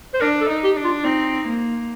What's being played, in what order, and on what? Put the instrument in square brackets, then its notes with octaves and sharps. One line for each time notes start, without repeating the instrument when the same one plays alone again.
[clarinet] C5
[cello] D4 [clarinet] A#4
[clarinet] A4
[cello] D#4
[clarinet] G4
[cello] D4
[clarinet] F4
[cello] C4 [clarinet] D#4
[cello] A#3